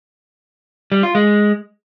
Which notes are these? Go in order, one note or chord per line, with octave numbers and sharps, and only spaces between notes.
G3
F4
G#3